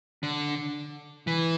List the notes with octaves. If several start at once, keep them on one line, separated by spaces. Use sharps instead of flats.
D3
E3